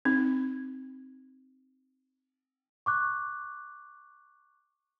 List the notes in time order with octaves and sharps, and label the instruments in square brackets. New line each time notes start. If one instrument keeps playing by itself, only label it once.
[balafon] C4 D#4
[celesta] C#6 D6 F#6